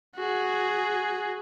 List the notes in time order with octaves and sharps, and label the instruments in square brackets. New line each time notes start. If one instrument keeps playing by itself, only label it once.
[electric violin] F#4 G#4